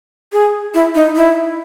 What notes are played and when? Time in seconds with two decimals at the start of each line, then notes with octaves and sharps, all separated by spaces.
0.33 G#4
0.74 E4
0.95 D#4
1.16 E4